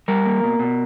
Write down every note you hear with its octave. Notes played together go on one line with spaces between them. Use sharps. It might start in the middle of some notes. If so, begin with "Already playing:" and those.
G3 A#4
A#3
B2
B2